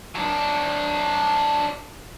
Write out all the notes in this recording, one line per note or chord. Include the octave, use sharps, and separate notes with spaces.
F#3 D4